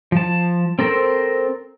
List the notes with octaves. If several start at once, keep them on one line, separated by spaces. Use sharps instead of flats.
F3 A5
C4 A4 A#4 C5